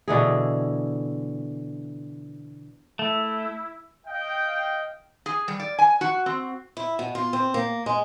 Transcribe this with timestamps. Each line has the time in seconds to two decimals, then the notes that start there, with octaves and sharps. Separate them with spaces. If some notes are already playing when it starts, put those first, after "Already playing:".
0.08 B2 D3 E3 G#4
2.99 A3 E4
4.06 D#5 F5 G5
5.26 G#4
5.48 G3
5.60 D5
5.79 G#5
6.01 F#4
6.26 C4
6.77 E4
6.99 B2
7.15 F4
7.33 C4
7.54 A#3
7.86 G#3